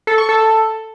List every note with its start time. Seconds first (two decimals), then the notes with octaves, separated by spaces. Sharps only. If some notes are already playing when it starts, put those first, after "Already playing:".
0.07 A4
0.18 C#6
0.29 A4